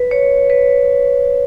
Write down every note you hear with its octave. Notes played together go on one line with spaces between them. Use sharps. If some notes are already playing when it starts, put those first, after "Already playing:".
Already playing: B4
C#5
B4